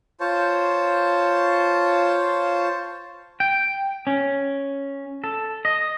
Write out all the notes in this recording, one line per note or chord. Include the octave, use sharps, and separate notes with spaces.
F4 C5 C#5 A5
G5
C#4
A4
D#5